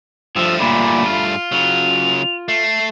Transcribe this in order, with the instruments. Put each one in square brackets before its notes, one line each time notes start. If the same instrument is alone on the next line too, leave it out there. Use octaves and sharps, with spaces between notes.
[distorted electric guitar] G2 A3 [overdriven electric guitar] F3 [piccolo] E6
[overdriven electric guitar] A#2 D3 [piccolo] B5
[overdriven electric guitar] F4
[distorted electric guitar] C#3 F#3 [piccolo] F7
[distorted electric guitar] A3 [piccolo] C7